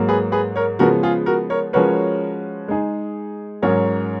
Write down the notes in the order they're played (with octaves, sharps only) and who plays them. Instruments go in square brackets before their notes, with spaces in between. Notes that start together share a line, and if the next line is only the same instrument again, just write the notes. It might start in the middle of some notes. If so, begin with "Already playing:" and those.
Already playing: [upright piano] G#2 F#3 A#3
[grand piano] G#4 B4
G#4 B4
A#4 C#5
[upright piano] C#3 F3 G#3 B3 [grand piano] F#4 A#4
[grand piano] F4 G#4
F#4 A#4
A#4 C#5
[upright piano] F3 G#3 C#4 F#4 B4 [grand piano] A#4 C#5
[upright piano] G#3 D#4 G#4
[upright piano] G#2 F#3 C#4 G#4 [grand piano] A#4 C#5